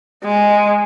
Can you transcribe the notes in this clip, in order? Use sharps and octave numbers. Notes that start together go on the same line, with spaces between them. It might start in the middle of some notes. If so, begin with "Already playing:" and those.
G#3